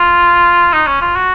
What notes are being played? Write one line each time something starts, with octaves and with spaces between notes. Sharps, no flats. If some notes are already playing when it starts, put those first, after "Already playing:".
Already playing: F4
D#4
C#4
F4
F#4